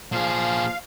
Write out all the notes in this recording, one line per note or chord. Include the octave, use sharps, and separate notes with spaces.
A#2 F3 G#4 F5